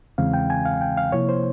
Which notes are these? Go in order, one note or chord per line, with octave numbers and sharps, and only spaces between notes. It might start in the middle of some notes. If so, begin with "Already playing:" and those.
E2 C#3 E3 G#3 C4 F5
G5
G#5
F5
G5
F5
C3 F3 A#3 E4 C#5
C5